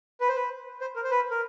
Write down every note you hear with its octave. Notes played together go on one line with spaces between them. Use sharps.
B4
C5
B4
C5
A#4
C5
B4
A#4